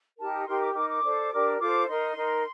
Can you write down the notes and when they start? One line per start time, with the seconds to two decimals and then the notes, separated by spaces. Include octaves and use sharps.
0.18 D#4 G4 A#4 A5
0.46 D#4 G4 A#4 C6
0.60 D6
0.75 D#4 A#4 D6
0.89 D6
1.03 D4 A4 C5
1.32 D4 G4 A#4
1.59 F4 A4 C5 D6
1.87 D#4 A#4 C6
2.15 D#4 A#4